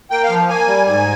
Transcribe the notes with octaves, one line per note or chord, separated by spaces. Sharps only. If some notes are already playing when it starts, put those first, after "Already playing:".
A#3 G5
F5
F3
A#3 G#5
G3
G#2 G#5